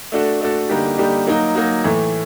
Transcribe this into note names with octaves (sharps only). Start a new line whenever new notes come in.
A3 D4 F#4 A4
A3 D4 F#4 A4
D3 G3 A#3 D#4 G4
D3 G3 A#3 D#4 G4
F#3 A#3 D#4 F#4
F#3 A#3 D#4 F#4
A2 E3 A3